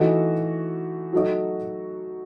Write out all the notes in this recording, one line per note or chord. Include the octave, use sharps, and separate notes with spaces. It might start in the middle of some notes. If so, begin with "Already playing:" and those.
Already playing: E3 A3 D#4 F#4
F#3 A3 D#4 F#4